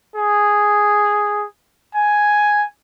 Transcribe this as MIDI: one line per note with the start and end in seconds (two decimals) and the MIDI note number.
0.16 1.45 68
1.95 2.64 80